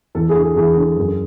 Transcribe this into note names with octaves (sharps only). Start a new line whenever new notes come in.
E2 A4
G#4
D3
G#4
E2 G#4
D3
F#2